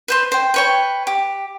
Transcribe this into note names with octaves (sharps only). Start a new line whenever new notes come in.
B4 C5 C6
C5 G5
B4 C#5 G5
G4